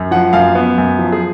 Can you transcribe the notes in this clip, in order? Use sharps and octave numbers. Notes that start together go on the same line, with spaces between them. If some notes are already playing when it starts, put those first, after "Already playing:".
Already playing: F#2
F3 F#5
F#2 F5
B3
F#2
F3
G#4